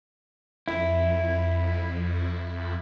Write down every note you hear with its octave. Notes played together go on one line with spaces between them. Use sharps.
F2 E4